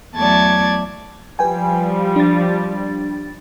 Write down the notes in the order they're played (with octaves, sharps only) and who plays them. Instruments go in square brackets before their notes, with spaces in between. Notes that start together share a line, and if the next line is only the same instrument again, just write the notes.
[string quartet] E2 F#3 A3 D5 A5 G#6
[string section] F3 G3 [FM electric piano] B4 G5 G#5
[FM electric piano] D4 A6